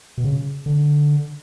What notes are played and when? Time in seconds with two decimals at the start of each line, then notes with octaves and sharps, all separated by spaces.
0.18 B2
0.24 C#3
0.66 D3